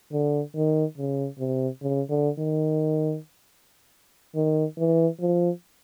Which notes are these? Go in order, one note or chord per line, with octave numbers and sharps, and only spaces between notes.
D3
D#3
C#3
C3
C#3
D3
D#3
D#3
E3
F3